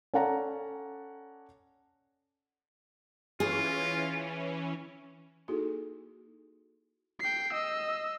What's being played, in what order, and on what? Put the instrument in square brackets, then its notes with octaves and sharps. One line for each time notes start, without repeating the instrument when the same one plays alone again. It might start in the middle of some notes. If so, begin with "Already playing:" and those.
[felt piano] C#4 A4 D5 F#5 A5 A#5
[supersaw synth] E3 C#4 [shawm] F4 [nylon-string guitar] G#4
[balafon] A#3 D#4 E4 F#4 G#4 A4
[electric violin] G5 C7
D#5 E6